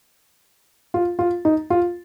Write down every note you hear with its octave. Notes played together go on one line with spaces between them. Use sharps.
F4
F4
D#4
F4